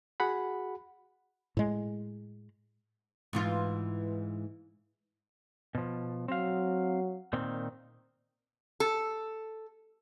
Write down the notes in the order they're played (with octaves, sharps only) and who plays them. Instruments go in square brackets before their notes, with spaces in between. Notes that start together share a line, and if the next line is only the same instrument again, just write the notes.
[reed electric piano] F#4 G#4 F#5 B5
[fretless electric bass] A2 G#3
[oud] G#2 E3 F4
[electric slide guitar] B2 F3
[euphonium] F#3 [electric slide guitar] C4 F5
[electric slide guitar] A#2 D#3 C4
[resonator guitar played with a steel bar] A4